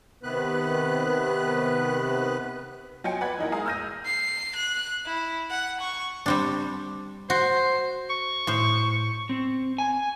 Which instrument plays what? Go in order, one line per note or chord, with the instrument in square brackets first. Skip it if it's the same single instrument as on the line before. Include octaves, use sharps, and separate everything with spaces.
[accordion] C3 D#3 B3 B4 F#6
[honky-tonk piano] F#3 F4 D#5 G5 G#5 C#7
B4 D5 F#5 B5 G#6
E3 D#4 A#4
G#3 F5 G#5 A#5 D#6
E6 F6 G6 A#6 D#7
[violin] C7
F#6
E4
F#5
C#6
[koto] G3 C4 D4
[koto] F#4 [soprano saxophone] C5
[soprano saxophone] C#6
[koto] A2 C5
[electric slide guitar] C4
G#5